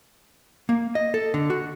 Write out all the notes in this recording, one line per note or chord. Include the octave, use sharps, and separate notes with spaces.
A#3
D#5
A4
D3
F#4